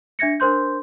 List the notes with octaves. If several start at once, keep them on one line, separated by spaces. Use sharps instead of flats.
D4 E5 G#6 A#6 C#7
D4 A#4 C5 C6 G6